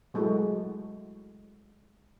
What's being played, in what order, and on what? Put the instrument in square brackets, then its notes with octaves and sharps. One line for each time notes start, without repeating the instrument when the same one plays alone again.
[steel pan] F#3 G#3 A3 E4 F#4